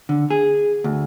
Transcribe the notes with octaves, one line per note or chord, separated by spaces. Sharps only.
D3
G#4
D2